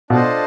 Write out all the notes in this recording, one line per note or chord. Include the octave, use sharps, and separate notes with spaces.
B2 D4 F4 A4 C5 D#5